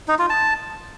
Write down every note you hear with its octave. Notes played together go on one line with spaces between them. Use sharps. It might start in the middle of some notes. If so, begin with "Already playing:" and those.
D#4
F4
A5